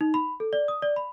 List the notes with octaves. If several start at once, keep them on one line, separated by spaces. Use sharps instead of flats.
D#4
B5
A4
D5
D#6
D5
B5